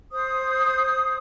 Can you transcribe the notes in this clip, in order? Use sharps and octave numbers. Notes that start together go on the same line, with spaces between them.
C5 D#6